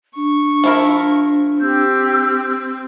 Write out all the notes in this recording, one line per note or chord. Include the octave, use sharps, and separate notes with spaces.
D4 C#6
F3 E4 A#4
C4 G4 E6 G6